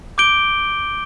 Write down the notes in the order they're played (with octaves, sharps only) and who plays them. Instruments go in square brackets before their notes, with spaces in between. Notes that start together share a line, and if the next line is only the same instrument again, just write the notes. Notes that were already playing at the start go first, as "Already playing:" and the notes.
[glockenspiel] D6 G6 D7 G7